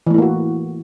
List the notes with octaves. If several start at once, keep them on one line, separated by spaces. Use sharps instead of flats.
E3 A3 A#3 E4 F#4